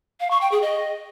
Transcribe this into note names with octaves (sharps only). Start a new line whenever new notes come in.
F5
C#6
G5
G#4
D#5